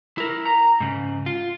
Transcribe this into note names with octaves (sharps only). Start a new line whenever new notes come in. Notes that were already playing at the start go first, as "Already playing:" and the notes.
E4 A#4
A#5
G#2 C#3
F4